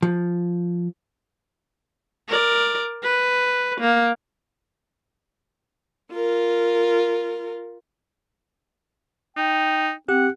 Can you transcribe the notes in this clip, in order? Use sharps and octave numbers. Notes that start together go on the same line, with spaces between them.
F3
A#4 D5
B4
A#3
F4 A#4
D#4 G5
C4 G4 F#5